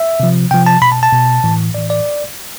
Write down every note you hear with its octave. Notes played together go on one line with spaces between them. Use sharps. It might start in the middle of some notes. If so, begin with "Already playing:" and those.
Already playing: E5
C3 F3
C3 F3 G5
A5
B2 B5
A5
A5
B2
A2 E3
A2 E3 D5
D5